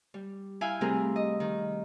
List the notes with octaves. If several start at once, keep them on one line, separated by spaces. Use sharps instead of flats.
G3
E4 E5 F5 G5 G#5
C3 G3 A3 C4 G#4 A#4
D#5
D#3